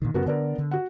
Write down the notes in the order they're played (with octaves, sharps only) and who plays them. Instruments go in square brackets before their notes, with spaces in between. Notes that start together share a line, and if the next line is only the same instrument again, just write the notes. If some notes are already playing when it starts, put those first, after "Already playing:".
[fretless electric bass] A#2 D3 D#3
[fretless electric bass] F#2 C#3 [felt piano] B3 F#4 A#4
[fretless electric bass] D3 [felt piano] B3 D4 A#4
[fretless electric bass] D3
[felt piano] F#4 F#5